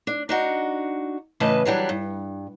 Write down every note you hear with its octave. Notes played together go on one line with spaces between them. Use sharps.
D4
D4 D#4 F#4
A2 C#3 E3 B4 D#5 A5
E3 F#3 G3 D4
G2